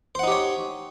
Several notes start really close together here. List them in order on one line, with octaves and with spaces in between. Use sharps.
C5 F#5 D#4 G4 C#5